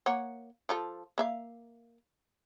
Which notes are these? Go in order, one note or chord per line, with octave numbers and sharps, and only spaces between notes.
A#3 C#5 F#5
F3 F4 A4
A#3 E5 F5